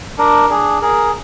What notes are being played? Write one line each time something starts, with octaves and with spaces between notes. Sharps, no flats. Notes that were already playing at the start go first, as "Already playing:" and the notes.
D4 A#4
D4 G#4
G#4 A#4